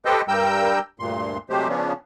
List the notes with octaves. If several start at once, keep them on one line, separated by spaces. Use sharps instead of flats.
G4 A4 B4 C5 D#5 G5
G2 G3 A#4 G5 E6 G6
D2 G2 A#2 C6
C3 F#3 G#3 A3 G4 C5
C#3 F3 B3 C#4 D4